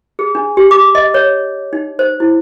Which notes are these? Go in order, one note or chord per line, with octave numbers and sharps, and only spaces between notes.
G#4
D4
G4
D6
D#5
C#5
D#4
C5
E4